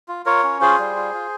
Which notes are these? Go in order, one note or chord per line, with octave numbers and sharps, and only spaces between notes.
F4
F4 A#4 C#5
C#4
F4 G#4 C5
G3
F4
F4